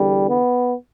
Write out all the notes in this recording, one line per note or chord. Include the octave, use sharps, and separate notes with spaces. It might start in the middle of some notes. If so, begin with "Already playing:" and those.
Already playing: E2 D3 G3
B3